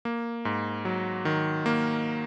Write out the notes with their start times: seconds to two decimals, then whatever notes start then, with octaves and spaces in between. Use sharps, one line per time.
0.05 A#3
0.45 G#2
0.85 F#3
1.25 D#3
1.66 A#3